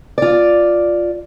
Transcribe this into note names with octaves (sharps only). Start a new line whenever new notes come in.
F4 D5